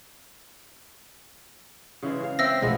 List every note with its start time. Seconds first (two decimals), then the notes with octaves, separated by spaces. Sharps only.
2.03 C#3 E3 G#3
2.24 F5
2.39 C4 E5 E6 A#6
2.62 B2 F3 G#3 A3 B3 C4